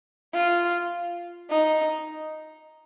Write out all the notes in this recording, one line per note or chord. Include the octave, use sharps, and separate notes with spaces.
F4
D#4